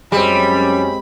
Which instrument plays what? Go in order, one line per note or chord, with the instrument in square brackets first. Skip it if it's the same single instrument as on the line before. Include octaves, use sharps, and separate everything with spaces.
[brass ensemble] F#2 C#4 [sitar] G3 [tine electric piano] G#3 C4 [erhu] B5